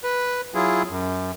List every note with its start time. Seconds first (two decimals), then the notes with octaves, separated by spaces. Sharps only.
0.04 B4
0.55 F#3 E4 F4 G#4
0.89 F#2